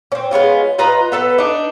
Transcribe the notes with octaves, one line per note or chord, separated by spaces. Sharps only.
C4 C#4
G#3 B3 C#4 F4
F4 B4 D#5 A#5
B3 A4 B4
D4 D#4